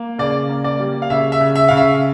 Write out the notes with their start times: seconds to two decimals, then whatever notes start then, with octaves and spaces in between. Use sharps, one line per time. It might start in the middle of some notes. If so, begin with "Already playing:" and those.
Already playing: A#3
0.18 C#3 D5
0.49 A#3
0.64 D5
0.79 G3
1.02 F5
1.10 C#3 E5
1.32 E5
1.40 C#3
1.55 E5
1.68 C#3 F5
1.77 E5